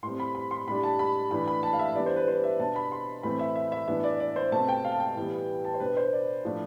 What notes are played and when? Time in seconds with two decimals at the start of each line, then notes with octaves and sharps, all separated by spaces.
0.03 A2 G3 C4 C6
0.20 B5
0.35 B5
0.51 C6
0.67 A2 G3 D4 B5
0.83 A5
0.99 B5
1.31 A2 E3 A3 D4 B5
1.48 B5
1.63 A5
1.73 F5
1.79 E5
1.95 E3 G3 B3 D4 D5
2.06 C5
2.16 B4
2.28 C5
2.44 E5
2.59 B2 B3 D4 A5
2.76 B5
2.92 C6
3.23 A2 E3 A3 C4 B5
3.39 E5
3.56 E5
3.72 E5
3.88 A2 E3 B3 D4 E5
4.04 D5
4.20 D5
4.36 C5
4.52 B2 A3 C4 A5
4.69 G5
4.85 F5
4.92 A5
5.00 G5
5.16 A2 E3 G3 B3
5.65 A5
5.74 C5
5.80 B2 B3 D4 B4
5.97 C5
6.13 D5
6.45 A2 F3 A3 D4